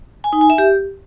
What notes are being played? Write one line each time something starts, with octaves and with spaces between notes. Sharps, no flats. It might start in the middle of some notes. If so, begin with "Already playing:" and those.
G#5
D#4
G#5
E5
G4